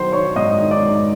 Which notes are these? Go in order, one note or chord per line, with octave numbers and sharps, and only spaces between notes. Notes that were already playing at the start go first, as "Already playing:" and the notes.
Already playing: D#3 F#3 C5 C6
D#3 C#5 C#6
G#2 D#5 D#6
D#3
D5 D6
G#2